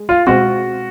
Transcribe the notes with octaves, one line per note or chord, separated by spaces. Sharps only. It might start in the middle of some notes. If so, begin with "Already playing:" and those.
Already playing: G#3
F4
B2 G#3 C4 F#4